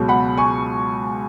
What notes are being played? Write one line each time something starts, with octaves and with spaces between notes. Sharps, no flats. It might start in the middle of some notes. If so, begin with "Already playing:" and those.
Already playing: C#2 B2 F#3
F#5 B5
G#5 C#6